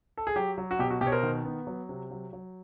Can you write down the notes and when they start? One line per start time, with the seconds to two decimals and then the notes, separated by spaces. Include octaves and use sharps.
0.17 A4
0.27 G#4
0.36 F#3 G4
0.58 F#3
0.71 F#4
0.79 B2 G4
0.90 F#4
1.01 B2 G4
1.07 C#5
1.12 A#4 C5
1.23 D#3
1.45 B3
1.67 F#3
1.89 C3
2.11 F#3
2.33 F#3